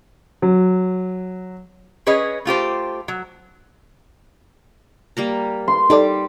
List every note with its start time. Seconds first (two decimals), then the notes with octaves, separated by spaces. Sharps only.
0.42 F#3
2.07 C#4 G#4 B4 C#5 D#5
2.45 A3 F4 G4 C5
3.08 F#3
5.17 G3 A#3 A#5
5.68 C6
5.90 G3 D#4 A4 D5 D6